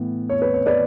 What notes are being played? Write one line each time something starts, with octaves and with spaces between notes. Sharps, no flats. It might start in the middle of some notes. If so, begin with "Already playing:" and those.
Already playing: A2 E3 B3
C#5
B4
C#5
B4 D5